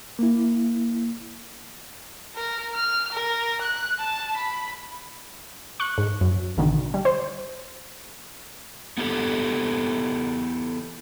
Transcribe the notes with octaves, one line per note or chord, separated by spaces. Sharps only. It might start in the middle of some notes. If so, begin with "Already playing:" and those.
A#3 E4
A#4
F6
A#4
F#6
A5
B5
C#6 F#6
G#2
F#2
A1 B2 D3 D#3
G3
C5
B3 E4 G4 A4